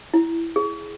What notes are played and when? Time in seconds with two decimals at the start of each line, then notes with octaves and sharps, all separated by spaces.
0.14 E4
0.56 G#4